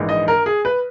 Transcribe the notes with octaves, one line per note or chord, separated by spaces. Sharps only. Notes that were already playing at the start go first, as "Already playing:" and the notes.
Already playing: A#1 G#2 E3
D#5
A#4
G#4
B4